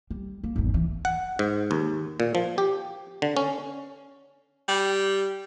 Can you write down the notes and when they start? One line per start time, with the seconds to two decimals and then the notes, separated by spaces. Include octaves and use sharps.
0.10 G3
0.44 A#3
0.56 G#1 E2
0.74 E3
1.05 F#5
1.39 G#2
1.71 D#2
2.20 A#2
2.35 F3
2.58 G4
3.22 D3
3.37 C#4
4.68 G3